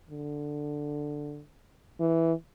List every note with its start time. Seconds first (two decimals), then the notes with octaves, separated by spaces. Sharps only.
0.10 D3
2.00 E3